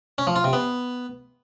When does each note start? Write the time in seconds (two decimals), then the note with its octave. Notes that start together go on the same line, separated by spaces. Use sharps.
0.18 C#4
0.27 F3
0.36 F4
0.44 C3
0.53 B3